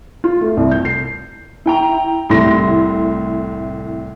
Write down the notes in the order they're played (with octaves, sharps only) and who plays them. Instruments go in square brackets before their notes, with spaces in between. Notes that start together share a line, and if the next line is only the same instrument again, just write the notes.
[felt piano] F4
A3
C2
G6
C7
[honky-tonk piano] E4 G5 A#5
C2 A2 E4 C6 A#6